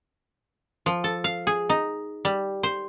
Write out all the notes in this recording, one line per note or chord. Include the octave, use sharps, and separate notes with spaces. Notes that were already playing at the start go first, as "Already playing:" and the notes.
F3
A4
F5
G#4
D#4
G3
C5